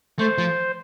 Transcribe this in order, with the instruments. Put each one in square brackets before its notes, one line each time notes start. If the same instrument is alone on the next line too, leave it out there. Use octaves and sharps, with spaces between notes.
[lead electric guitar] A3 [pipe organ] C5
[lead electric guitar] F3